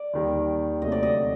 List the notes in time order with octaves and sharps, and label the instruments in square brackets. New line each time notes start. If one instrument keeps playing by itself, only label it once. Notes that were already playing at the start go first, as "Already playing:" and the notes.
Already playing: [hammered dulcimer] D5
[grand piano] D#2 D#3 G3
[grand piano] D2 C3 F#3 A3 [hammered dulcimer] D#5
[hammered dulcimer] D5
D#5